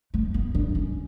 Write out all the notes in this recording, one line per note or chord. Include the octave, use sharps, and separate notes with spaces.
A3
B3
D4
C#4